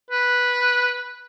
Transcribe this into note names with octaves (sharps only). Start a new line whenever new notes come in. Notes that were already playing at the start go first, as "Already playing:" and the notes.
B4